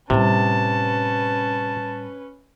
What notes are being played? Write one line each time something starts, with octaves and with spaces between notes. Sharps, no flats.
A2 C3 G3 C#4 B4 A5